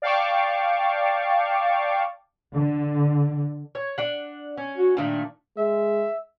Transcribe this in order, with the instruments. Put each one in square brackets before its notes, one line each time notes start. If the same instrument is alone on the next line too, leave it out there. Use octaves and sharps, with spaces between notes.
[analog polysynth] D5 F5 G5 A5 C#6 D6
[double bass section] D3
[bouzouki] C#5
D4 F#5
C#4
[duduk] F#4
[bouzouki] A#2 D#3 A3 [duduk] D4
[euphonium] G#3 [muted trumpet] E5